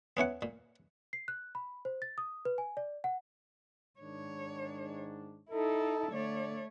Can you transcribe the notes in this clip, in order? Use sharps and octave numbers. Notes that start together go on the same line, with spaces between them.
B3 C#4 E4 F#5
A#2
C7
F#6
B5
C5
A6
D#6
B4
G#5
D5
F#5
G#2 D#3 D4 C#5
D#4 E4 A4
D3 A3 C#5 D5